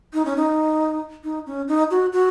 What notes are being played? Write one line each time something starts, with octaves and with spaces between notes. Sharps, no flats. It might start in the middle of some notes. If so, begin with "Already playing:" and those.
D#4
C#4
D#4
D#4
C#4
D#4
F#4
F#4